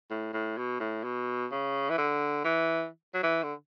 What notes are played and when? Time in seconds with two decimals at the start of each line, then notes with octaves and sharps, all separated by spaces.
0.11 A2
0.33 A2
0.58 B2
0.80 A2
1.04 B2
1.51 C#3
1.90 E3
1.98 D3
2.44 E3
3.14 F#3
3.23 E3
3.43 D3